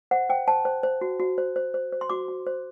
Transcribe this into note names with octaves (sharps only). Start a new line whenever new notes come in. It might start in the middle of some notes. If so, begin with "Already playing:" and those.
C5 F#5
C5 G5
C5 A5
C5
C5
F#4
F#4
C5
C5
C5
C5
C6
F#4 D6
F#4
C5